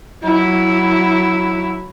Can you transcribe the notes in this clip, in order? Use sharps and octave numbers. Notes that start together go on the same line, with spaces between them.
F#3 E4